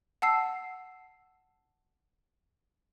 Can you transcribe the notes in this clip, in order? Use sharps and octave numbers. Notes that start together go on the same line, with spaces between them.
F#5 A5 E6 C7